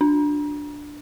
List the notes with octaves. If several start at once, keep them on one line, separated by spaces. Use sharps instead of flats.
D4